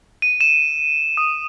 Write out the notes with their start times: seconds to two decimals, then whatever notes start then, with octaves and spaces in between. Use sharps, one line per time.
0.22 D#7
0.41 E7
1.17 D#6